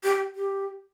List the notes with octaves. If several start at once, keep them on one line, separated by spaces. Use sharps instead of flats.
G4
G4